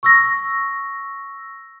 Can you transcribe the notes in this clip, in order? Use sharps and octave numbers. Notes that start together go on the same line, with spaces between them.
C#6 E6 A#6